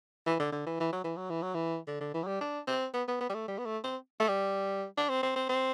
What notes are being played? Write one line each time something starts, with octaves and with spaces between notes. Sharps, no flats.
E3
D3
D3
E3
E3
F#3
E3
F#3
E3
F#3
E3
D3
D3
E3
F#3
G3
D4
C4
B3
B3
B3
G3
A3
G3
B3
A3
C4
A3
G3
D4
C4
C4
C4
C4